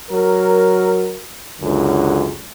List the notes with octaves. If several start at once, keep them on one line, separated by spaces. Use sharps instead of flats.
F#3 A#4
C#2 F#2 D3